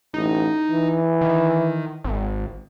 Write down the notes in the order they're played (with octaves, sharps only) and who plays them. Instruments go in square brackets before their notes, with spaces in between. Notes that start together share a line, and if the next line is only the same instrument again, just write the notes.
[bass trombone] A1 [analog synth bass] D#4
[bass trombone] E3
[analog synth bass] D#3
G#1